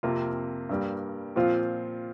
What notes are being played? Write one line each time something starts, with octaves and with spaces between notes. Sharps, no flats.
F2 C3 A#3 F4
G2 G3 A#3
A#2 F3 C4 F4 C5